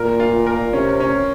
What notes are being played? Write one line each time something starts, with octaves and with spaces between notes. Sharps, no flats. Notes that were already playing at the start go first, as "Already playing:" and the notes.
Already playing: A#2 A#4
F4
A#4
C3 C#4
C#4